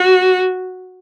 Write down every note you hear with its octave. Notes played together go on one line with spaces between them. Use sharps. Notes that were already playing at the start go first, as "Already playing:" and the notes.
Already playing: F#4